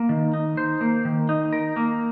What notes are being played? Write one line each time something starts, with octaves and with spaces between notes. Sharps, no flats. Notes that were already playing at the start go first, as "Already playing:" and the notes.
Already playing: A#3
D#3
D#4
C5
A#3
D#3
D#4
A#4
A#3